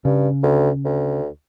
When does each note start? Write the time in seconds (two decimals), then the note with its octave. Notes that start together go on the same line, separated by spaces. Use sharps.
0.05 G2 C#3
0.43 D2
0.85 D2